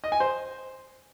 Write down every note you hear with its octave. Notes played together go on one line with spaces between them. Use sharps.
D#5
G#5
C5